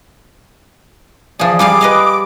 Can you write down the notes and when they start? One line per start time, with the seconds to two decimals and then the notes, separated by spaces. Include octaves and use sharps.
1.39 F3 G#4 D5
1.59 G3 G#4 F5 D6
1.81 B4 D#5 F5